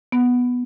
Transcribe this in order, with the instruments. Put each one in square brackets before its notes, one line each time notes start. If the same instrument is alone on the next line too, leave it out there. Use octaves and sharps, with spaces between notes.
[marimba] B3